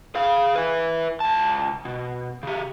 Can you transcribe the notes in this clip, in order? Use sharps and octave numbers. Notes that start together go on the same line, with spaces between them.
G#4 F5
E4 B4
C#2 A5
B2
C#3 G4